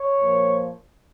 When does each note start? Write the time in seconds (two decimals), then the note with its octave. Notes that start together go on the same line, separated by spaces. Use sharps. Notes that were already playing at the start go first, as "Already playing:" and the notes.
Already playing: C#5
0.19 A#2 F3